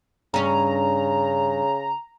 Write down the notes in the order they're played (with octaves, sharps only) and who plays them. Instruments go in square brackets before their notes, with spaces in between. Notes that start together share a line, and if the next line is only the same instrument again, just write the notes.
[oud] G2 C#4 [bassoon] C#3 [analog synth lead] A#5